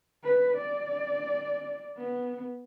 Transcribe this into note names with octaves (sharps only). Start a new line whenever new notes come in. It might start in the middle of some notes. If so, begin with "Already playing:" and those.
B4
D5
B3